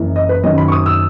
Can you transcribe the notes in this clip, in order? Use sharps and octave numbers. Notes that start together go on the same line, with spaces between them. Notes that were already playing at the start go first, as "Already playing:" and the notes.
Already playing: F#1 F#2 E3
D#5
B4
F#1 F#2 D#3 F#3 C#4 D#5
B5
C#6
D#6
E6